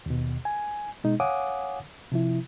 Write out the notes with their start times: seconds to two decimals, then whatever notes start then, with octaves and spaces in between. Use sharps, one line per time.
0.06 D#2 B2
0.45 G#5
1.05 B2 G#3 D#4
1.20 C#5 F5 F#5 G#5 D6 D#6
2.12 C3 F3 E4